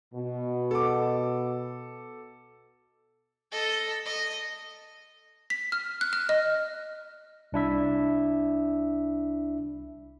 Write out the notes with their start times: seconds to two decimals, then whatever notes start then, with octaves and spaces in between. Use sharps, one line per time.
0.14 B2
0.71 A4 D6
3.52 A4 D#5
4.06 D#5
5.50 B6
5.72 F6
6.01 F#6
6.13 F6
6.29 D#5
7.52 C2 D4 E4 E5